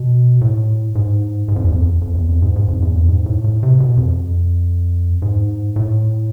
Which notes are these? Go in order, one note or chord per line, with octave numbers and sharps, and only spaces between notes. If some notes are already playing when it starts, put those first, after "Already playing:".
Already playing: B2
A2
G#2
G#2
F2
E2
F2
F2
E2
F2
G#2
G#2
F2
E2
F2
G#2
A2
A2
C3
B2
F2
G#2
A2